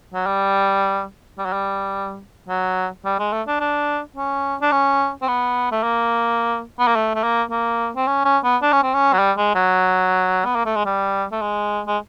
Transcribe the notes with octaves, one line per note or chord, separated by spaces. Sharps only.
F#3
G3
G3
F#3
G3
F#3
G3
G#3
A3
D4
D4
C#4
D4
C#4
C4
B3
A3
A#3
B3
A#3
A3
A3
A#3
A#3
C4
C#4
C#4
B3
D4
C#4
C4
C#4
F#3
G3
G#3
F#3
B3
A#3
A3
G#3
G3
A3
G#3
G#3